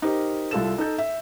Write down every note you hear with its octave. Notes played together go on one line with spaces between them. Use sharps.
D#4 G4 A#4 C5
C2 F4 A4 E7
D#4 A4 G6
E5